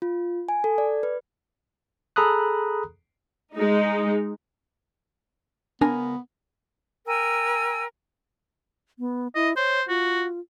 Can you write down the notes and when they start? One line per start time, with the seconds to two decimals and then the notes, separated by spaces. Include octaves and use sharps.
0.02 F4
0.49 G#5
0.64 A4
0.78 D5
1.03 B4
2.16 G#4 A4 A#5 B5 D#6 F#6
3.54 G#3 D#4
5.81 C#2 B3 D4 A#4 G#5
7.07 A#4 G5 G#5 E6
8.99 B3
9.35 E4 D#5
9.57 C5 C#5
9.89 F4 F#4